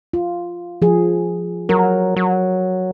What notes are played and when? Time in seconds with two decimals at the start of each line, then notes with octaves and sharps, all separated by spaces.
0.13 F4
0.82 F3 G#4
1.69 F#3 A#4
2.16 F#3